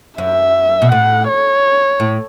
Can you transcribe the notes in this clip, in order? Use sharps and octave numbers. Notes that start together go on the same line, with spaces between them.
F#2 E5
B2
A2 F#5
C#5
A2